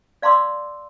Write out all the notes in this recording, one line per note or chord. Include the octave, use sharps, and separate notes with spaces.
D5 F5 A#5 C6 D6 E6